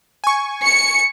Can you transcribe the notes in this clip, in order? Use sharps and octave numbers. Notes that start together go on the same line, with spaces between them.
G#5 C#6
C#7